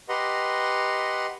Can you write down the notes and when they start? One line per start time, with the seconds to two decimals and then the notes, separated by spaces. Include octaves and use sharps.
0.09 G4 B4 D#5 F#5 A#5 C6